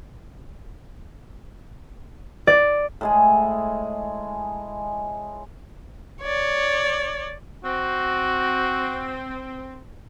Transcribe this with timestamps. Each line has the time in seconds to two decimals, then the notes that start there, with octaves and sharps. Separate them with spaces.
2.47 D5
3.01 A2 G#3 G#4
6.22 C#5 D5
7.64 C4 F#4